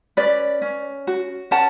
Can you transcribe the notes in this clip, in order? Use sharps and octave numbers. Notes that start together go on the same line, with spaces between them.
C#4 B4 D5
C#4
F#4
C#4 F#5 A5